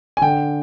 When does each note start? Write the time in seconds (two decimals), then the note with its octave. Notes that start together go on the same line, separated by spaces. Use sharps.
0.17 G#5
0.21 D3 G5